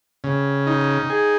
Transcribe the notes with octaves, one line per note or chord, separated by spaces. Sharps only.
C#3
D#4
G#4